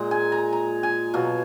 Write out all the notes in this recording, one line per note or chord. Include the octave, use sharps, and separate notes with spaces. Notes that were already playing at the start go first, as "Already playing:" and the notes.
Already playing: A#2 G#3 A#5
G#5
A#5
A#5
G#5
B2 F#3 F5